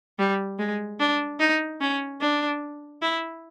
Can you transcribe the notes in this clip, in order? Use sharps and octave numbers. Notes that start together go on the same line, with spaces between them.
G3
G#3
D4
D#4
C#4
D4
E4